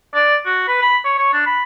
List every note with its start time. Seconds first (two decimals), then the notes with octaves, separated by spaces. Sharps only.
0.14 D5
0.46 F#4
0.68 B4
0.81 B5
1.05 C#5
1.18 C#5
1.33 D4
1.46 B5